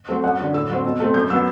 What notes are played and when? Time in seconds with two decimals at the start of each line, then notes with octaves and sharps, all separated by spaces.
0.08 F#3 A3 C4
0.24 F#2 F#5
0.38 D3 F#3
0.54 A2 E6
0.70 F#3 C4
0.84 B2
1.00 A3 C4
1.14 F#2 G6
1.30 F#3 B3 E6